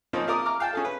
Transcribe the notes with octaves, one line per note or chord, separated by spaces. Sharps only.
F3 A#3 C4 C#4 D#4 F4
F4 A#4 D5 D#6
A#5 D6 F6
F5 G5 A5
C#4 G#4 A4
B4